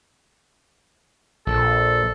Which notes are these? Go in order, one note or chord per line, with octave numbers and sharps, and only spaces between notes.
A#1 A4